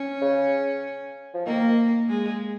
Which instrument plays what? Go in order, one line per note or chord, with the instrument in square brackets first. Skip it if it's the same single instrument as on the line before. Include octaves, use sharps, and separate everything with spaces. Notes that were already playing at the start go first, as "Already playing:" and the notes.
Already playing: [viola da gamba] C#4
[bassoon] C#3
F3
[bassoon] D#3 [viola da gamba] A#3
[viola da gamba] G#3